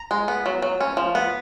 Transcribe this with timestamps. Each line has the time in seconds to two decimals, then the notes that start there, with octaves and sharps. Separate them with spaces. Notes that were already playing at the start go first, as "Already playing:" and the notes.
Already playing: A#5
0.11 G#3
0.28 B3
0.46 F#3
0.62 F#3
0.81 C#4
0.97 F3
1.15 B3